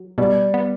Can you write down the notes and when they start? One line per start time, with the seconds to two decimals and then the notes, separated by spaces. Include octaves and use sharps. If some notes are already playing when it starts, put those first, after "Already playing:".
Already playing: F#3
0.18 B2 G3
0.54 B3